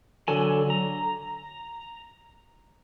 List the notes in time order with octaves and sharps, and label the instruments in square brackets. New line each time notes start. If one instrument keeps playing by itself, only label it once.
[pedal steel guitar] D3 F#3 A4 G#5
A#5